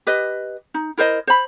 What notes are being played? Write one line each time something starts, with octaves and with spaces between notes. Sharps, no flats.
G4 B4 D#5
D#4
E4 A#4 C5 D#5
C5 B5